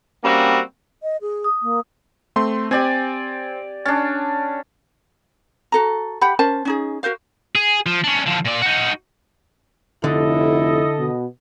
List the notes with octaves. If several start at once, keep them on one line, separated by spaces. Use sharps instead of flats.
G3 A#3 C4 C#4 F#4
D#5
G#4
D#6
A#3
A3 C4 C6
C4 G4 D5 G#5
C#4 D4 A6
F#4 A4 A#5
G4 F#5 B5
C#4 A#4 C5 A5
C#4 D#4 G#4
F#4 A#4 C5 F5
G#4
F3
C#4 D4
D3 F3
A#2 D5
D#4 F#4
F1 D3 E4 A4 D#5
B2